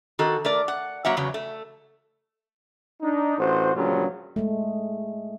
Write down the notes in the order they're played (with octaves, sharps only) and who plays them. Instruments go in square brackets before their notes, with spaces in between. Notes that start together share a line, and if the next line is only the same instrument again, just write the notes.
[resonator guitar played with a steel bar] D#3 F#4 A4
A3 A#4 D5
F#5
F#3 A#3 E5 F#5
E2 C#3 F#3
A3
[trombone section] D4 D#4
A1 F#4 C5
A#1 G2 C#3 F#3 F4
[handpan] G#3 A3